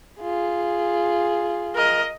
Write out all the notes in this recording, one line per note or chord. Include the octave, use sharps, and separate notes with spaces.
F4 G#4
A#4 D#5